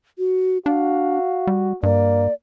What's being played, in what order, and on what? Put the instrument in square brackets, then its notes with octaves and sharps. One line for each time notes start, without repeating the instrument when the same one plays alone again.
[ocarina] F#4
[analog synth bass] D4 [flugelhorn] F#4 [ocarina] F5
[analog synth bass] G3
[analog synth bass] G2 [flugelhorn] A#3 [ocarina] D5